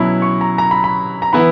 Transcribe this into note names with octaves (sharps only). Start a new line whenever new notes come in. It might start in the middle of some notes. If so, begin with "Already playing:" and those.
Already playing: B2 F#3 C#4 E4 B5
C#6
A#5
A#5
B5
B5
A#5
E3 B3 E4 B5